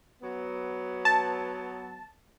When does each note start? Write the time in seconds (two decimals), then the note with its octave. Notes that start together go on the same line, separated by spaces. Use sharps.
0.22 F#3 B3
1.05 A5